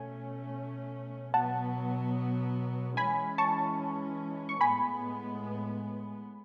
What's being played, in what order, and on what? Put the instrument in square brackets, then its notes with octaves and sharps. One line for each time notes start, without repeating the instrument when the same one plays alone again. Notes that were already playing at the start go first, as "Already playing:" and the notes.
Already playing: [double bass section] B2 A3 C#4 [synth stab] G#5
[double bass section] B2 F#3 B3 [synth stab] F#5 A5
[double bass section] E3 G#3 C#4 [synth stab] G#5 B5
[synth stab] A5 C#6
C#6
[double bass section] A2 G#3 B3 [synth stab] G#5 B5